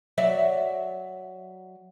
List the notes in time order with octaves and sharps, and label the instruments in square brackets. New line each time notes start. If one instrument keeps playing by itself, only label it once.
[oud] F#3 D5 E5